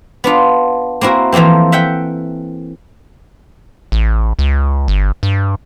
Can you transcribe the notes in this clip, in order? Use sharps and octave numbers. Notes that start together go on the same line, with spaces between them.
B3 D4 F4
A#3 C4 E4 F#4 A#4
E3 F3 A3 A#3 C4
E5 F#5 G5
A1
C#2
G1
G2